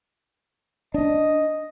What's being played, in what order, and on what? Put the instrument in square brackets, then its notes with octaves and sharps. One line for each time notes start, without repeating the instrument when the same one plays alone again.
[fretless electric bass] D4 [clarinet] D#5